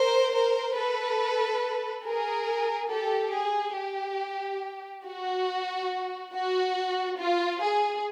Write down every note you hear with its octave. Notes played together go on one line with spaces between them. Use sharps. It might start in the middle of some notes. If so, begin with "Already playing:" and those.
Already playing: A#4 C5
A#4 C5
A4 B4
G#4 A#4
G4 A4
G#4
G4
F#4
F#4
F4
G#4